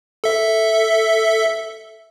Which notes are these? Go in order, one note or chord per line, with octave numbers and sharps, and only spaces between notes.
A4 E5